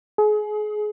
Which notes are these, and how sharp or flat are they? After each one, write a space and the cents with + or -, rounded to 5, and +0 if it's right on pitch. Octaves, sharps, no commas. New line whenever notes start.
G#4 +30